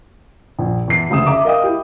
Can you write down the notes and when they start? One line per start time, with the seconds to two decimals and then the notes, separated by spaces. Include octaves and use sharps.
0.59 A#1
0.88 E2 C7
1.10 F1 D2 C#3 D#6 E7
1.27 E5 A#5 D6
1.45 A#4 D#5 F5 G5 D#6
1.64 E4 G4